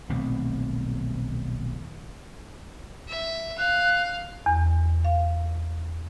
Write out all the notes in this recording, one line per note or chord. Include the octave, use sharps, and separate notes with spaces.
D#1 B1 A3 C4
E5
F5 F#6
E2
F5